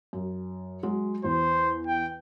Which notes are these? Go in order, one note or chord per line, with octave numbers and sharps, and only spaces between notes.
F#2
F#3 G#3
E2 C5
G5